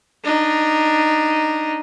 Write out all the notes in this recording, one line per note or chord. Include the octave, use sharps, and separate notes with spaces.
D4 D#4